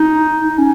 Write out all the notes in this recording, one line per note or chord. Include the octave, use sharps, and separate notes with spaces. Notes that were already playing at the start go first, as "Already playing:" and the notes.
Already playing: D#4
D#4
C#4